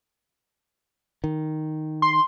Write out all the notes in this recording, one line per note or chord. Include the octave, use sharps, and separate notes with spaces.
D#3
C6